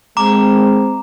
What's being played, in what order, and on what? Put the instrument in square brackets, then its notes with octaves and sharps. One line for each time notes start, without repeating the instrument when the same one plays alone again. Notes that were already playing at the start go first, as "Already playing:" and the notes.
[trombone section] G#3 C4 [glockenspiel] A#5 D6